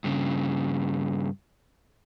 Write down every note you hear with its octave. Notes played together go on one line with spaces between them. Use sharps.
G2 C#3